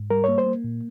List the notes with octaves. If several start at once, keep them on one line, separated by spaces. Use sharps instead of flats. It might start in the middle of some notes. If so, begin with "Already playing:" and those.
Already playing: G#2
G3 A#4
A#3 C#5
C5
A#3
A#2